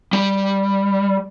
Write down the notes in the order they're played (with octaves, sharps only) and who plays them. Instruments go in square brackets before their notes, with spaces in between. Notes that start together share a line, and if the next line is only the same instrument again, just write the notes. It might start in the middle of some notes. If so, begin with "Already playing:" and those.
[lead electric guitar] G3